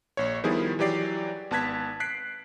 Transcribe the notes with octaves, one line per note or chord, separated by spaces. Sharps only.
A#1 C#5
D#3 F3 G3 B3 E4 G#4
E3 F#3 G4 D5 C7
G#1 B3 A5 F#6 G#6 B6
F#6 B6 C7 D7